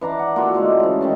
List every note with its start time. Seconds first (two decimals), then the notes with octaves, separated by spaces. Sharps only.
0.01 E3 D4 A#5 D6
0.19 F#5
0.36 A#3 F4 F#4 A4
0.54 D3 G#3 A3 C#4
0.80 C#3 E3
1.01 D#3 C#4 A5